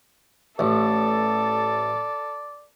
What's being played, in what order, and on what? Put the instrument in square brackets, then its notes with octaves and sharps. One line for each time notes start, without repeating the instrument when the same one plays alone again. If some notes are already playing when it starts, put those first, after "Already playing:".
[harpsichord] A1 [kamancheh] A4 [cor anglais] D5